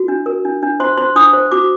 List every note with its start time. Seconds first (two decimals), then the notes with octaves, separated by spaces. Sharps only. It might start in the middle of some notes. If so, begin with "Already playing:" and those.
Already playing: F#4
0.08 D4
0.26 A#4
0.45 D4
0.63 D4
0.80 C5 C6
0.97 C5 C6
1.16 D4 D#6
1.33 C5
1.52 F#4 D6